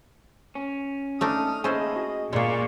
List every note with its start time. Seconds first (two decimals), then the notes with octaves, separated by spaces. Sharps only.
0.55 C#4
1.21 A3 D4 D#4 D#6 F6
1.64 D#2 C#4 E4 G#4 A4 C5 D#5 G#5
1.96 F#4
2.33 A#2 G#3 A#3 D5 C#6